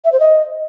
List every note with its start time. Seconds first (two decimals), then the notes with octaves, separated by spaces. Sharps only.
0.05 E5
0.12 C5
0.20 D#5